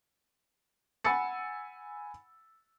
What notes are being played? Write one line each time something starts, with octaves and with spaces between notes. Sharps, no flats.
F#5 G#5 B5 E6 A6 C#7